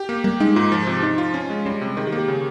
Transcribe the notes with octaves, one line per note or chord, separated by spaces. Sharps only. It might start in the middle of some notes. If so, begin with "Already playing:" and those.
Already playing: G4
A#3
G3 A#3
G#3 D#4
G#2 F4
F3
C3
F3 D#4
F4
C#4
G#3
G3 C#4
C3
D#3 G#4
G4
A#3
G4
C#3